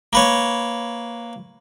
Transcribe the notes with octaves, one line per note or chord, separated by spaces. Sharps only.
A#3 B4 C#5